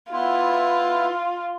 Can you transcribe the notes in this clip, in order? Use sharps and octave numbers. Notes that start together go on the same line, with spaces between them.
B3 E4 F4 C6